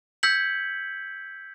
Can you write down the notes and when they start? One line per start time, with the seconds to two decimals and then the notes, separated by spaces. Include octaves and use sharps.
0.23 E6 G6 G#6 B6 C#7 F#7